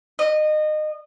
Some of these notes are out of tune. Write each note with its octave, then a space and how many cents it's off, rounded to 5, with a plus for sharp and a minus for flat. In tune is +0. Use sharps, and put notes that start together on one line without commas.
D#5 -25